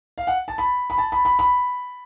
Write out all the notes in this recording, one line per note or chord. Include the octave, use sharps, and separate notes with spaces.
F5
F#5
A5
B5
B5
A5
B5
B5
B5